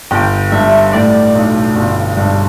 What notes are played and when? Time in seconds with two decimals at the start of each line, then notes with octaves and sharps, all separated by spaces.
0.11 G1 G5
0.52 G2 E5
0.93 A2 D5
1.35 B1
1.76 G1
2.17 G2